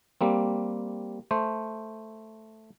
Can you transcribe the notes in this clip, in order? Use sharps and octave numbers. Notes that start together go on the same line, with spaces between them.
G3 A#3 C4
A3 C5